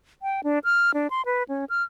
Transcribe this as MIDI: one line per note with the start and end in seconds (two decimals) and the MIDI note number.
0.22 0.41 79
0.44 0.59 62
0.64 0.91 89
0.94 1.08 62
1.10 1.22 84
1.26 1.43 71
1.48 1.65 61
1.69 1.83 89